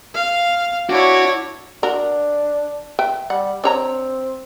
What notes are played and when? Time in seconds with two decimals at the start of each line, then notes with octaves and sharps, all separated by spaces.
0.15 F5
0.90 D4 E4 F#4 C#5 D6
1.83 D4 F#4 A#4
2.99 B4 E5 G5
3.30 G3 F#5
3.64 C4 D4 C#5 A#5